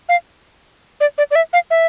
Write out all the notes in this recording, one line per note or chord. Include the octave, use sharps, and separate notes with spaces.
F5
D5
D5
D5
E5
F5
E5